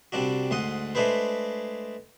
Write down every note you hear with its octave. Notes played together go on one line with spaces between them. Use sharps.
C2 G3 C4 D4 F#4
D2 G#2 F#5 C6 D#6
G#3 A3 D4 G#4 B4 C5